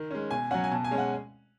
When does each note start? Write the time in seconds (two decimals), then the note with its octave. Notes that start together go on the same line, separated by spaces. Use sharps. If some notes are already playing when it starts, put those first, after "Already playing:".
Already playing: D#3
0.11 G#3 C#4
0.31 B2 G#5
0.51 F#3 C#4 F#5
0.64 G#5
0.71 B2 A5
0.84 G#5
0.91 G#3 C#4
0.98 F#5